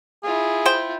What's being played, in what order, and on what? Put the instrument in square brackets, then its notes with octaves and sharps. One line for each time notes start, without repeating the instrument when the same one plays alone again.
[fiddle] E4 F4 [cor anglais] G#4
[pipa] C5 G5